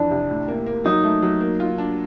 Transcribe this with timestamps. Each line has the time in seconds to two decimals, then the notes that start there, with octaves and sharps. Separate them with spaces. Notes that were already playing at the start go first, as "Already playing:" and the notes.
Already playing: F2 E3 D4
0.11 C3
0.29 A2
0.48 A#3
0.66 A#3
0.85 F#3 D#4
1.04 A3
1.22 F#3
1.41 A#3
1.60 F4
1.78 D4